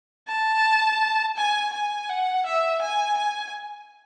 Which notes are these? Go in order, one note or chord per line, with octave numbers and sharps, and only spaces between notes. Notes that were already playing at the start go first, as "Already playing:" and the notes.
A5
G#5
G#5
F#5
E5
G#5
G#5